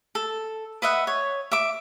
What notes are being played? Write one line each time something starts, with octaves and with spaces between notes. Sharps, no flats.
A4
B4 D#5 E5 F#5
C#5
E5 D6